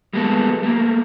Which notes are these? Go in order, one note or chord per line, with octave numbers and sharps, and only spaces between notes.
G3 G#3 A#3 B3 A4
A3 A#3